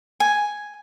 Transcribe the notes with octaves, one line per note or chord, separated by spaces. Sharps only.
G#5